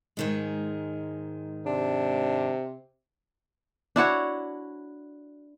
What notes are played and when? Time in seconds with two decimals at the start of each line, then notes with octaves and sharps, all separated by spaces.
0.17 G#2 D#3 G#3
1.66 C3 D4
3.96 D4 E4 F#4 C#5